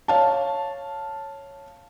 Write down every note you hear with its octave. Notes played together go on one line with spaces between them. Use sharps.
C#5 F5 A5